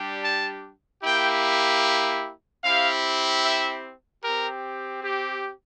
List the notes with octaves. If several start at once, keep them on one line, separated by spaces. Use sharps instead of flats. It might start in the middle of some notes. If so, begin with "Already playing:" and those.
Already playing: G3 D4 G4
A5
A#3 E4 G4 G5
C4 E4 G4 F5
E5
C4 G4 A#4
G4